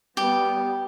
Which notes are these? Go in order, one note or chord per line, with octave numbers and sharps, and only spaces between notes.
G3 B3 G4